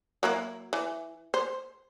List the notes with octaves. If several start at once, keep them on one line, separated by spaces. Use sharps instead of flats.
F#3 A#3 E4
E3
C5